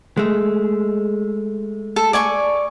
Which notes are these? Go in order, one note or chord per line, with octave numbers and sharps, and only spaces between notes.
G#3 A3
A4
D5 G#5 C#6